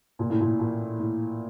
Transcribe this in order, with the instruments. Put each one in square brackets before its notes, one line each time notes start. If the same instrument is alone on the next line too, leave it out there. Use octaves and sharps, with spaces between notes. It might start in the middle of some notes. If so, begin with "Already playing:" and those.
[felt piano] A#2
A2
A#2
A#2
A2